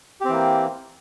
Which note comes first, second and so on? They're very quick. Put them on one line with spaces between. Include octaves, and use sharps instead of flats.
G4 C4 E3 A#3